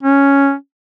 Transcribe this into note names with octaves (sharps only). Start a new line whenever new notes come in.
C#4